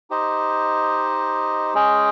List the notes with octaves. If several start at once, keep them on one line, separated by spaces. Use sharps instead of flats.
D#4 G4 C5 D#5
G#3 C#4 G#4 D#5 G5